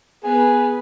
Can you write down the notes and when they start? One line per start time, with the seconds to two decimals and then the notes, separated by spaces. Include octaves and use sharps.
0.23 B3 G#4 B4